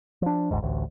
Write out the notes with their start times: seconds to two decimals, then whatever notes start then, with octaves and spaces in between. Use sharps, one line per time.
0.22 F3 D4
0.51 F#1 D2 G#2
0.63 A1 D2